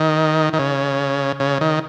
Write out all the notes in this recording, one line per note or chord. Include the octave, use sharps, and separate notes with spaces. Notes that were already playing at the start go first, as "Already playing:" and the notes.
Already playing: D#3
D#3
C#3
C#3
D#3